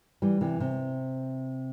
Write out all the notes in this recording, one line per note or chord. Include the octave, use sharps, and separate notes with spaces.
E3 G3
C3 E3
C3